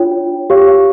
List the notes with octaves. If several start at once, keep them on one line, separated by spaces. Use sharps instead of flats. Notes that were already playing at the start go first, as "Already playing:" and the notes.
Already playing: D4 F4 C#5 G5
G4 C#5 F5 C#6